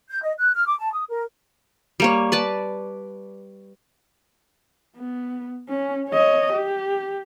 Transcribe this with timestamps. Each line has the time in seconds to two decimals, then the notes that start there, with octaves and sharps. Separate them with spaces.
0.10 G6
0.22 D#5
0.39 F#6
0.54 F6
0.67 D6
0.80 A5
0.93 D#6
1.09 A#4
2.00 G3 A#3 C#5
2.32 B4 D5 A5
4.97 B3
5.69 C#4
6.09 C#5 D#5
6.53 G4